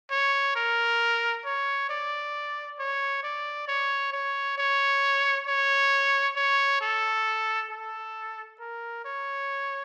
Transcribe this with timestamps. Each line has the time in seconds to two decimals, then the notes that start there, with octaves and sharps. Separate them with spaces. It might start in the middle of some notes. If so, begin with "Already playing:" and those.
0.11 C#5
0.55 A#4
1.45 C#5
1.89 D5
2.79 C#5
3.23 D5
3.68 C#5
4.13 C#5
4.58 C#5
5.47 C#5
6.36 C#5
6.81 A4
7.70 A4
8.60 A#4
9.05 C#5